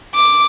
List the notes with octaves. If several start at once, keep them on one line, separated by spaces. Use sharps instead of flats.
D6